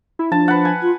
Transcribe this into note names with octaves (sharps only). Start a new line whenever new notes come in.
E4
F3 D4 A5
B4 F#5
G#5
F4